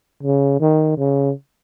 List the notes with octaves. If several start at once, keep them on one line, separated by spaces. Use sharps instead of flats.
C#3
D#3
C#3